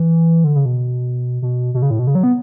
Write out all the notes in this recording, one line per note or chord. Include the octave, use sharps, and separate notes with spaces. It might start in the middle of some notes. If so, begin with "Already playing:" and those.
Already playing: E3
D3
C#3
B2
B2
B2
C#3
A2
B2
C#3
F#3
B3